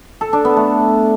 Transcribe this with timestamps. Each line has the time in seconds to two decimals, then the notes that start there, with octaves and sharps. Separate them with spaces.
0.21 A4
0.33 D4
0.45 B3
0.57 A3